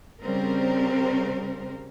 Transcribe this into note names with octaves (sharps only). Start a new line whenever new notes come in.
C#3 G3 C4 A#4 C5